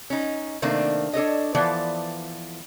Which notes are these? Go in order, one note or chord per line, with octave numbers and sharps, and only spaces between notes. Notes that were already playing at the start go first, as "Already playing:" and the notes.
C#4 D#4
C3 D#3 A3 A#3 C4 D4
D4 A4 C#5 D#5
E3 F3 B3 A4 D5